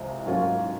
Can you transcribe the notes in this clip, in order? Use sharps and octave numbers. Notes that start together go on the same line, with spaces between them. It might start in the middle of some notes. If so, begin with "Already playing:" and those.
Already playing: C2 C3 F3 G#3
G#2 F#3 A#3 C#4 F4